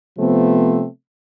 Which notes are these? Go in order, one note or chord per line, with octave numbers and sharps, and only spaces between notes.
C3 F3 A3 B3 C4